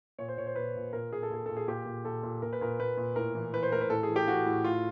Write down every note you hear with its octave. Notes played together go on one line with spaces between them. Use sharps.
A#2 C#5
C5
A#2 C#5
C5
A#2 B4
A#2
A#2 A#4
A#2 G#4
A4
A#2 G#4
A#2 A4
G#4
A#2 G4
A#2
A#2 A4
A#2
A#2 A#4
B4
A#2 A#4
A#2 B4
A#2
A2 A#4
E3
E3 B4
C5
A2 A#4
B4
A2 A4
G#4
E3
G4
E3 F#4
A2
A2 F4